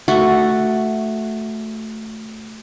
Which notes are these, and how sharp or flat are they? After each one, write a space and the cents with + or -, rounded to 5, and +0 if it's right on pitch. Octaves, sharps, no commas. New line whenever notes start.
A3 +0 F#4 +0